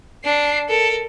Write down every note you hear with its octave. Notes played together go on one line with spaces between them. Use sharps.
D4 C7
A4 A#4